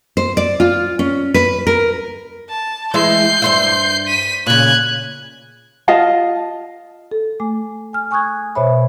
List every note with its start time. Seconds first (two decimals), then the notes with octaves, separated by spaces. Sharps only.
0.17 C5
0.37 D5
0.60 F4
0.99 C#4
1.34 B4
1.67 A#4
2.49 A5
2.94 E3 G#3 E5 G6 C7
3.42 G2 C5 E5
4.07 B6 D#7
4.47 A#2 C#3 F#6 G#6
5.88 F4 D#5 F5 A5
7.12 A4
7.40 A3 G#5 D6
7.93 G#5 F6
8.11 G#5 C#6 D#6 F#6 G#6
8.55 B2 C5 C#5 E5 B5